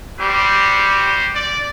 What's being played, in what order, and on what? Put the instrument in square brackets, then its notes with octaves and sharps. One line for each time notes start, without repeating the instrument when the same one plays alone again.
[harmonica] G3 [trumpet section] F#4 G4 C5
[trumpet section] D5